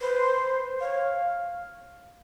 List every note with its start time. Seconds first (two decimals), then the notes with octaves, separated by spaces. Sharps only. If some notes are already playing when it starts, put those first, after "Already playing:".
0.01 B4 C5
0.80 C#5 F5